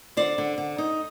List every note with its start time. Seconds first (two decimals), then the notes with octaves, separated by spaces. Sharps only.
0.17 D3 C5 D5
0.38 D3
0.58 D3
0.78 D#4